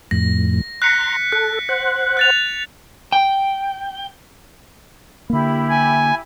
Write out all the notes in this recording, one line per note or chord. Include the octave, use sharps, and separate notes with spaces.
F2 A2 A#6
A#5 C6 F#6 B6 C#7
A4 F#6
C5 F#5
F#6 A6 F7
G5
D3 A#3 E4 G4 B5
G#5